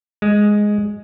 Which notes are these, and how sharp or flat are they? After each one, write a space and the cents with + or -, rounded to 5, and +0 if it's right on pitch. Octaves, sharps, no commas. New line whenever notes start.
G#3 +0